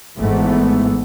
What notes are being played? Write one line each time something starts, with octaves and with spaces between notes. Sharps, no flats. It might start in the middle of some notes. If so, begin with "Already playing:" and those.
G#1 G#2 E3 A3 B3